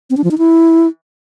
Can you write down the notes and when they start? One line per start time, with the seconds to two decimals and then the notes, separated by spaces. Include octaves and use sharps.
0.10 C4
0.17 D4
0.24 F3
0.31 D#4
0.38 E4